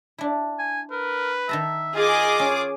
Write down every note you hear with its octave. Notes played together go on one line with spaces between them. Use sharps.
D4 E4
G#5
A#4 B4
D#3 E5 A5 A#5
F4 G#4 D#5 D6
C#4